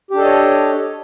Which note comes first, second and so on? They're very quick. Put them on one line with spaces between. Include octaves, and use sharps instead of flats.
G4 D4 A4 D#5 C#5